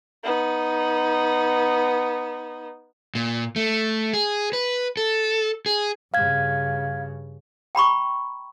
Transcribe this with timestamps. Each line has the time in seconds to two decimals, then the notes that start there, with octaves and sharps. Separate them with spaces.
0.23 B3 D#4
3.15 A#2
3.56 A3
4.13 G#4
4.53 B4
4.97 A4
5.66 G#4
6.14 G2 C#3 F5 G#6
7.75 G5 A#5 B5 C#6